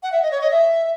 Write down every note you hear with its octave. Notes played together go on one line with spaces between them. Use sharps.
F#5
E5
D#5
C#5
D#5
E5